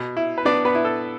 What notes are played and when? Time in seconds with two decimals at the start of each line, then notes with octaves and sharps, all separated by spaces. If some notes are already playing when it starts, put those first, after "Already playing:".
Already playing: B2
0.17 E4
0.38 B4
0.45 B3 D4 D5
0.65 B3 B4
0.75 E4
0.85 A4